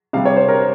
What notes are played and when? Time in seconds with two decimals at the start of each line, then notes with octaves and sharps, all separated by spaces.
0.13 C3 G3 F5
0.25 C#5
0.37 C5
0.49 A#4